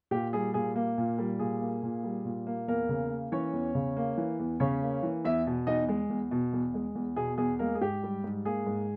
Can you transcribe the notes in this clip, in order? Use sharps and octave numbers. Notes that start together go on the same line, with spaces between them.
A#2 G4
G3 G#4
A#2 G#4
A#3
A#2
G3
A#2 G#4
A#3
A#2
G3
A#2
A#3
E2 A#3 A#4
C#3
A#3
E3 C#4 C#5
E2
C#3
A#3
E3
E2
C#3 C#4 C#5
A#3
E3
E2 E4 E5
B2
E2 D#4 D#5
G#3
E2
B2
E2
G#3
E2
B2 G#4
E2 G#4
G#3 A#3 A#4
G#4
G#2 G4
G3
G#2
A#3 G#4
G#2